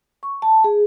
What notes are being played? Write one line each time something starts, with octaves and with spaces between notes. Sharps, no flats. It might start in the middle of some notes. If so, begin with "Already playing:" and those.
C#6
A5
G#4